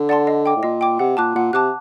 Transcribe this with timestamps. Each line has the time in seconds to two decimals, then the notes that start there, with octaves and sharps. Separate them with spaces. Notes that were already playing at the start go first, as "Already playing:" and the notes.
Already playing: D3
0.09 D5 F#5 A5 C6
0.27 D#5
0.46 G5 D6
0.56 A2
0.63 A#2 D#5
0.81 G5 D6
0.99 C3 F#5
1.17 A#2 A5 D6 F#6
1.35 A#2 F#5
1.53 C3 A5 D6 F#6